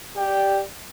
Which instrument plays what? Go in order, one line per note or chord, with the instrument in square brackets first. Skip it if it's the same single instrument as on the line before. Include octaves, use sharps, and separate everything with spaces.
[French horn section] G4 D5 [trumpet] G5